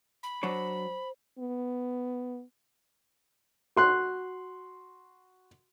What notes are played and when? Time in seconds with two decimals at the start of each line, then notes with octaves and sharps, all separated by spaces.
0.23 B5
0.43 F#3 D4 C5 C#5
1.39 B3
3.76 F#4 C6 F#6